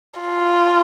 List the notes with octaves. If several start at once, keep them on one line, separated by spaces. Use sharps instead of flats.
F4